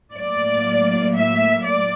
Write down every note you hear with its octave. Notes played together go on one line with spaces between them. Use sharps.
A2 F#3 A#3 D5
E5
D5